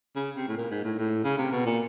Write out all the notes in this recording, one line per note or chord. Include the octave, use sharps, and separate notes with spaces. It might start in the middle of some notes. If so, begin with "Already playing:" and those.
C#3
C3
A2
A#2
G#2
A2
A2
C#3
C3
B2
A#2